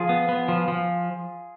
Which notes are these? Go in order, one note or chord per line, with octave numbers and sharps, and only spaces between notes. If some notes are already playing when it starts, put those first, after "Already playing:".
Already playing: F3 F4 G#4
B3
B3
F3
F3